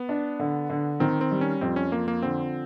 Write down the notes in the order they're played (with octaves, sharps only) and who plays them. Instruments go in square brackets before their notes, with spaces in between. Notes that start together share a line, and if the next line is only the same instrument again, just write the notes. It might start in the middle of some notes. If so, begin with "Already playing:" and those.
Already playing: [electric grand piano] B3
[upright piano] D4
D3
D3
[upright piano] D#3 [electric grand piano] C4
[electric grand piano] C4
[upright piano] G3
[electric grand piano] C#4
[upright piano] F2 [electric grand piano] C4
[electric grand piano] C#4
[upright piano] F3 [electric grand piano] A#3
[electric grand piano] A#3
[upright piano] D3 [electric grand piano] C4